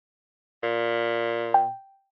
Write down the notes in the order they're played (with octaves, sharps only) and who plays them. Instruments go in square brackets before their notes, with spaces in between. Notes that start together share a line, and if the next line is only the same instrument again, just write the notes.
[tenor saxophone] A#2
[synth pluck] G5